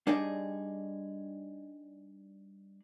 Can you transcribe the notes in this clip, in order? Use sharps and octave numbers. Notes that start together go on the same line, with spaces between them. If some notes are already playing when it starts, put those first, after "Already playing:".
G3 D4 D#4 G#4 D5 D#5